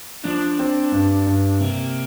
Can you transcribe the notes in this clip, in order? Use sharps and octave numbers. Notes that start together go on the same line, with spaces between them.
F3 D4
C4
G2
G2
C3 A#3